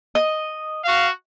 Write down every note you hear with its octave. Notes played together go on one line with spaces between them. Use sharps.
D#5
F#4 F5